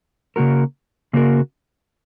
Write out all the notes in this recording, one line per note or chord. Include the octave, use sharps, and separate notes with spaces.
C#3 A#3 F#4 A#4
C#3 A#3 F#4 A#4